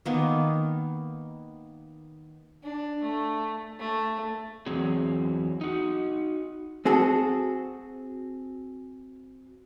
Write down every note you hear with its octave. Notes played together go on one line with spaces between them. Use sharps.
D#3 A#3 B3
D4
A3
A3
E2 F#3 C4 G#4
D#4 F#4
C4 F#4 G#4 A4